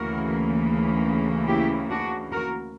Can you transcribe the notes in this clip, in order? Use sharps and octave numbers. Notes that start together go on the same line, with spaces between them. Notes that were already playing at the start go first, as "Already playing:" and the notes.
Already playing: D2 C#3 E3 A#3 F#4 A#4
E4 G4
D4 F#4
F#4 A#4